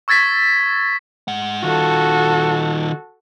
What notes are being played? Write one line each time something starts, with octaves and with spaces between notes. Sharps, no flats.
C#6 E6 G#6 A6 B6
G#2 F#5
D#3 F4 F#4 A4